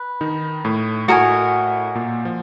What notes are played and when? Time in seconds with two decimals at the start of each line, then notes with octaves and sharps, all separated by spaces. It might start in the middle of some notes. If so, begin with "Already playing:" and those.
Already playing: B4
0.21 D#3 D#4
0.64 A2 A3
1.08 A2 A3 F#4 A#4 D#5 G#5
1.95 A#2 A#3
2.25 F3